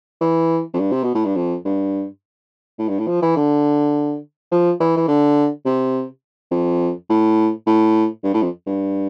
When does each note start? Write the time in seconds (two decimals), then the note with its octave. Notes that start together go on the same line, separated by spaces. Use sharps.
0.21 E3
0.74 F2
0.79 G2
0.92 C3
1.04 B2
1.15 A2
1.26 G2
1.36 F2
1.65 G2
2.79 A2
2.89 G2
2.99 A2
3.07 F3
3.22 E3
3.37 D3
4.52 F3
4.80 E3
4.97 E3
5.08 D3
5.65 C3
6.51 F2
7.10 A2
7.67 A2
8.23 G2
8.34 A2
8.43 F2
8.67 G2